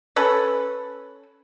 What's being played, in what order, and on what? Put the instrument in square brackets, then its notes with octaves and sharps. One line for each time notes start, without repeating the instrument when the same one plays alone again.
[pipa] C#4 A4 B4